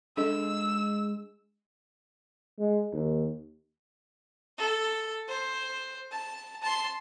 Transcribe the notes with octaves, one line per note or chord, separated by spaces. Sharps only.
G#3 D4 A4 D#5 E6
G#3
D#2
A4
C5
A5
A5 C6